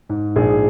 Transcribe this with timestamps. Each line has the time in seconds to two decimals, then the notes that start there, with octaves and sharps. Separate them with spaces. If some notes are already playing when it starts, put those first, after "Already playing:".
0.09 G#2
0.36 A#1 G#4